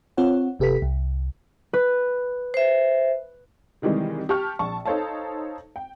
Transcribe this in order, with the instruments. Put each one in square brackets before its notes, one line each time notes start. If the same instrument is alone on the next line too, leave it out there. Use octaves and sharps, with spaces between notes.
[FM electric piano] C4 F4 C#5 F#5
G1 C3 G4 A4 B4 B6
C2
[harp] B4
[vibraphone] C5 E5
[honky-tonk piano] C3 D#3 E3 G3 G#3
G4 A5 C#6 F6
A#1 A5 C#6
D#4 A4 C5 C#5 F5 A5
G5